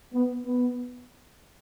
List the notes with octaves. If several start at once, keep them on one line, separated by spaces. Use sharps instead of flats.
B3
B3